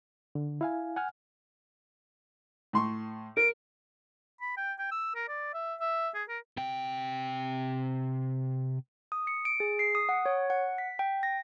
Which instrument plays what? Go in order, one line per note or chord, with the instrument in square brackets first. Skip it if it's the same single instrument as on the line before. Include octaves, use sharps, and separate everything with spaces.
[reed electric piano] D3
E4 F5 G#5
F#5 G#5 F6
[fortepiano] A2 C6 C#6
[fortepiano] A#4 [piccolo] D7
[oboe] B5
G5
G5
E6
A#4
D5
E5
E5
G#4
A#4
[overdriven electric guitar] C3 G5
[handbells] D#6
C#7
D7
G#4
C7
D#6
F#5
C#5
F#5
B6
G5
A#6